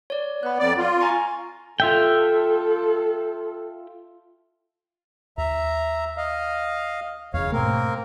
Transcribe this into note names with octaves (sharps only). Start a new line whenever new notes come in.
C#5 D5
B3 B5 F#6
F2 D5
F4
G#5 A#5 C#6
F4 A4 E5 G5
D#2 E5 A#5
D#5 F5
E1 E2 C#3 C#5 F5
G#2 B2 A3 A#3 C4 A#4